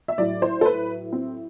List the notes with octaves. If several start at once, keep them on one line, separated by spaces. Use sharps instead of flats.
E5
A2 F#3 D5
C5
A4
B4
C4